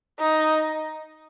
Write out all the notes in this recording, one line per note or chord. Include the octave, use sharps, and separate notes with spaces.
D#4